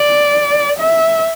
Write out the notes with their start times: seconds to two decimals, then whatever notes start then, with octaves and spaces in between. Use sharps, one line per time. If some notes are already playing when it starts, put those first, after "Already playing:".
Already playing: D5
0.79 E5